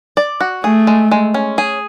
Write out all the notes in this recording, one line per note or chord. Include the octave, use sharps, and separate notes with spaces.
D5
F#4
A3 G#4
G#3
G#3
C#4
G#4